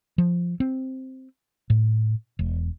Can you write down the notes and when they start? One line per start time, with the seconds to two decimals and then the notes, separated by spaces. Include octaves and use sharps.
0.18 F3
0.60 C4
1.70 A2
2.39 E1